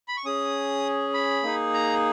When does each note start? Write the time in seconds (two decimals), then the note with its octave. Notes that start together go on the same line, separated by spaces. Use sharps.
0.08 B5
0.17 C#6
0.25 C#4 G#4 D#6
1.14 B5
1.43 A#3 D#4 G#4
1.74 A#5